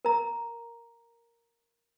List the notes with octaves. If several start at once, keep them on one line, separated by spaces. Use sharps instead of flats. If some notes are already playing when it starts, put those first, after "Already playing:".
A#4 A#5